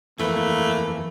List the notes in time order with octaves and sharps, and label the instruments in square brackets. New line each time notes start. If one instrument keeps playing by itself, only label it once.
[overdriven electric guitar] F2 E3 [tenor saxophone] A3 [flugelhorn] A#3 [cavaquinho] B4 E5